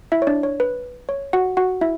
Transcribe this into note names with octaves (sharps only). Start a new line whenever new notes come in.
E4 E5
C#5
D4 D5
C#5
B4
C#5
F#4 F#5
F#4 F#5
E4 E5